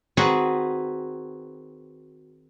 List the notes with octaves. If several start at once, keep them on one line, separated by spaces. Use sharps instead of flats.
D#3 C4 F#4 G#4 B4